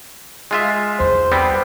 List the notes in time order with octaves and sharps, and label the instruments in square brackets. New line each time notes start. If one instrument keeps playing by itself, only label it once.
[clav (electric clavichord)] G#3 F4 E5
[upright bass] E2 D#4 [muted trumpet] C5
[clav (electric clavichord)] G3 B3 C4